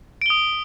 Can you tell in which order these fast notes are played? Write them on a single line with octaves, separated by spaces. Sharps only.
D7 G7 D#6